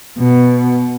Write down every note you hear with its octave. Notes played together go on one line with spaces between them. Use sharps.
B2